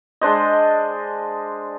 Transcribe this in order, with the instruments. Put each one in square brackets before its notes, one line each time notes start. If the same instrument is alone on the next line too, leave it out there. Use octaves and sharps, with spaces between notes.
[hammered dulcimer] G#3 D4 C5 D#5